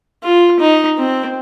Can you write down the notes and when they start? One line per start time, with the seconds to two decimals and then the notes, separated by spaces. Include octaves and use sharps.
0.23 F4
0.60 D#4
0.98 C4